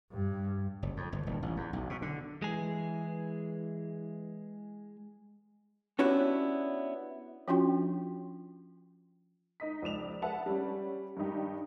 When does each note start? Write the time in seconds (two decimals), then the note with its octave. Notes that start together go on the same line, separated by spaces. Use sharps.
0.12 G2
0.83 F#1
0.97 F2
1.12 G1
1.26 D#1
1.42 A1
1.57 E2
1.73 B1
1.90 B2
2.02 D3
2.42 E3 G#3 G#4
5.99 B3 C#4 D4 E4 F#4 G4
7.48 F3 C#4 D4 F4 F#4 G5
9.60 D#4 D#5 B6
9.82 C#2 F3 D5 E7 F7
10.22 G#4 B4 E5 F#5 A5
10.46 G3 C#4
11.17 G2 D#3 D4 D#4 G4